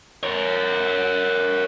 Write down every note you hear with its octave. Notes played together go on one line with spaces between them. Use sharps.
A#4 C#5